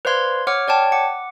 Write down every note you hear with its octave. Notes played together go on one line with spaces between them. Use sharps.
B4 C5 D5 F5 C6 G#6
C#5 F#5 D6 F6
C#5 D5 G5 A5
F#5 D6